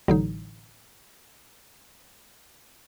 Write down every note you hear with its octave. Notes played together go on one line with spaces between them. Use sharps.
A1 D3 F#3 D#4